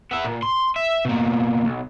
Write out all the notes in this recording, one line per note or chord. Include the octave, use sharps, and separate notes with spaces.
B3 E5
A#2
C6
E5
B2 A#3
B1